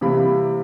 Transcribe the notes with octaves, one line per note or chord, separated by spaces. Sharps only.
C3 E3 G3 A#3 B5